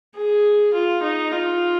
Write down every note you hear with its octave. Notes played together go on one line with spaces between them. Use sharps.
G#4
F4
D#4
F4